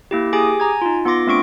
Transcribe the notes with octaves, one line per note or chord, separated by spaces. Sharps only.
A#3 E4 G4
G4 G#4 G#5 D6 D#6
G#5 A#5 G#6
D#4 F4
B3 F4 C6 D6 A#6
A3 C4 D4 C#6 D7